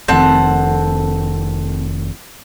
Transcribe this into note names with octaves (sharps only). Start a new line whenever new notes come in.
F1 F2 D#3 C4 A4 F#5